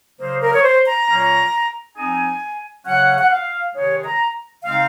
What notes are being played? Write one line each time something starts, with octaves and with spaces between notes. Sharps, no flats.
C#3 F#3 A#3 D#4 C5
A#4
C#5
C5
A#5
A#2 F#3 A#3 C#4
F3 C4 D#4 G#5
C#3 F#3 C#4 F#5
F#5
F5
C3 D#3 G#3 D#4 C#5
A#5
C#3 G#3 C4 D#4 F5